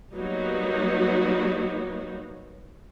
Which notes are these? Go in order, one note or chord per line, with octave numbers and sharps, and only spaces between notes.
F#3 G3 A#3 B3 D#4 F#4